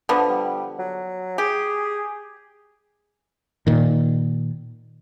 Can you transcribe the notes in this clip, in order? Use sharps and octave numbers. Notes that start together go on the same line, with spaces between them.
D3 F3 B3
G3
F#3
G4 G#4
A#2 D#3